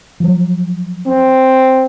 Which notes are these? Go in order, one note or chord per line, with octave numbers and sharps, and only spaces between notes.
F3 F#3
C4